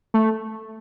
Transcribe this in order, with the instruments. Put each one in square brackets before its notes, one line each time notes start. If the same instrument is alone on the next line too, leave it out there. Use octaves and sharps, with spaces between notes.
[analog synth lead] A3